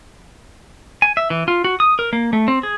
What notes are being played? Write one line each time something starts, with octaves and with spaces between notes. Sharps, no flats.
G#5
E5
E3
F4
F#4
D#6
A#4
A#3
A3
C4
G#4